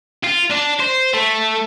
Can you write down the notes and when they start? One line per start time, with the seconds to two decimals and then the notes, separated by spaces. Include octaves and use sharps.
0.24 F4
0.51 D4
0.80 C5
1.14 A3